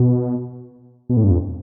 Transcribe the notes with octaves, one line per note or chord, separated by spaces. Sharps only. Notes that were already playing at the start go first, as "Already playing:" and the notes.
Already playing: B2
B2
A2
G2
F2